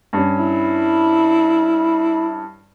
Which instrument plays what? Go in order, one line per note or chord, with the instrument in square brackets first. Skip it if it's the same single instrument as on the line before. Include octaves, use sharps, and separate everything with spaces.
[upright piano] G2 C#4
[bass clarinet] E4